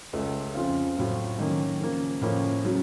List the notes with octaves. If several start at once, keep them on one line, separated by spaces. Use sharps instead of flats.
C#2 C#3 A3 C#4
F2 C#3 F3 C4 F4
A2 F#3 C4 F4
F#2 D#3 A#3 C#4
C#3 F3 A#3
A2 F3 A#3 C#4
C#3 F#3